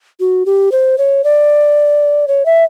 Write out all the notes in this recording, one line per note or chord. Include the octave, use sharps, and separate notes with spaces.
F#4
G4
C5
C#5
D5
C#5
E5